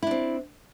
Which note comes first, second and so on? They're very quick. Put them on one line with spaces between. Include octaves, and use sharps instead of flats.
E4 D4 C4